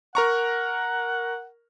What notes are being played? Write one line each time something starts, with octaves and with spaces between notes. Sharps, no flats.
A#4 F#5 A#5 C#6